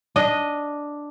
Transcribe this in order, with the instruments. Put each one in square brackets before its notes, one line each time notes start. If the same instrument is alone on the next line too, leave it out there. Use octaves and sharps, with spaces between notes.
[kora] D4 D#5